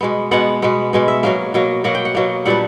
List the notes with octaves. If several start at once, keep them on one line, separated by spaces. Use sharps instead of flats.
B2 G#3 B3
B2 G#3 B3 F#5
B2 G#3 B3
B2 G#3 B3
E5
B2 F#3 A#3 F5
B2 F#3 A#3
B2 F#3 A#3 F#5
G5
F#5
B2 F#3 A#3
A#2 G3 B3 D4 F#5